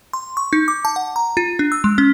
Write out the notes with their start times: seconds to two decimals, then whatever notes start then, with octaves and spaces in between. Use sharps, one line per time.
0.13 C6
0.37 C#6
0.53 D#4
0.68 D6
0.85 A5
0.96 F#5
1.16 A#5
1.37 F4
1.59 D4
1.72 E6
1.84 G#3
1.98 C#4